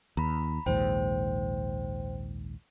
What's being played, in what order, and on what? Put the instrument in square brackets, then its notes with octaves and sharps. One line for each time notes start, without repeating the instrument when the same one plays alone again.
[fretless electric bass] D#2 [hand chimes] A#5 B5
[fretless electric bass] A#1 D#2 G#2 [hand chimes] C5 G5